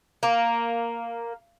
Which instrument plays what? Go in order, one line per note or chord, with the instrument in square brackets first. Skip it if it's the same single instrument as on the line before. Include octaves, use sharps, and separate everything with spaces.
[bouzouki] A#3